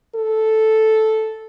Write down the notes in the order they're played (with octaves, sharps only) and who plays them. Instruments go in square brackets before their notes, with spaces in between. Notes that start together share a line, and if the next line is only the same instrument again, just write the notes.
[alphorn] A4